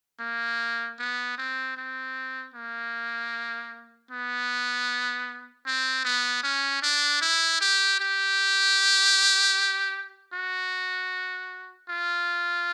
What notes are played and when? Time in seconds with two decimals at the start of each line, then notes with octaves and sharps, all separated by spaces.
0.20 A#3
0.99 B3
1.38 C4
1.77 C4
2.54 A#3
4.11 B3
5.67 C4
6.05 B3
6.44 C#4
6.82 D4
7.22 E4
7.61 G4
8.00 G4
10.33 F#4
11.89 F4